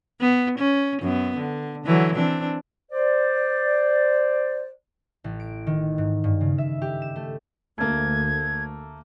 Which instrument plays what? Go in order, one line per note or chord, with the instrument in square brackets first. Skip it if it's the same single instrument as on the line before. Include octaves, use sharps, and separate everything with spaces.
[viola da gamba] B3
C#4
F#2 B3
D3
D3 E3 F#3
E3 C4 D4
[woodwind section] C5 D5
[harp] A1
D7
D#3
G#2
G2
C#3
E5
G4
E7
A3
[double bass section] D2 [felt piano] A3 A#3 [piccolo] G#6